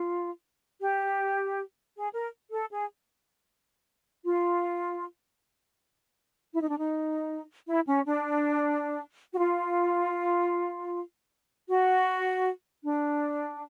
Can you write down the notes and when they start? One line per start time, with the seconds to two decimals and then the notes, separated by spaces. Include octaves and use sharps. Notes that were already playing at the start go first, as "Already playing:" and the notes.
Already playing: F4
0.81 G4
1.96 G#4
2.14 A#4
2.52 A4
2.71 G#4
4.24 F4
6.53 E4
6.61 D#4
6.70 D4
6.79 D#4
7.68 E4
7.87 C#4
8.06 D4
9.34 F#4
9.39 F4
11.69 F#4
12.83 D4